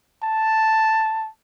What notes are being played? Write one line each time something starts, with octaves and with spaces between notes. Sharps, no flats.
A5